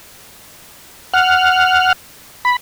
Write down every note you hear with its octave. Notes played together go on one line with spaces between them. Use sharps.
F#5 F6
B5